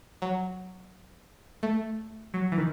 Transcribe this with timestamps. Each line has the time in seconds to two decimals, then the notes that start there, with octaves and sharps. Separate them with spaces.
0.22 F#3
1.63 A3
2.34 F#3
2.52 E3
2.58 D#3